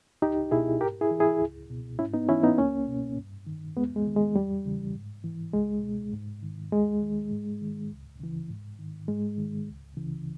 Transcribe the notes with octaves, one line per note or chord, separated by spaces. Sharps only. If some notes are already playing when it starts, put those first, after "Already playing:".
C#2 D#4 G4
B2 E4 G#4
G#2 G4 A#4
E4 G#4
E3
E4 G#4
C#2
B2
G#2 C#4 E4
B3 D#4
E3 C#4 E4
B3 D#4
C#2 A#3 C#4
B2
G2
D#3
E2 G#3 B3
G#3
D#3
G#3
E2 G3
C#3 E3
G#2
E3
C#2 G#3
B2
G#2
D#3
D#2 G#3
D#3
G#2
D#3
C#2
C#3 E3
G#2
D#3
G#2 G#3
D#3
C#2
C#3 E3